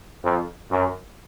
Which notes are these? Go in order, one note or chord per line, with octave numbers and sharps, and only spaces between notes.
F2
F#2